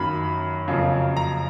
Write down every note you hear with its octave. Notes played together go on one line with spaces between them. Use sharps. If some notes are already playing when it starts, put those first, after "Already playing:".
Already playing: F#2 D#3 F#3 A#3 B5
F2 C#3 F#3 A#3
A#5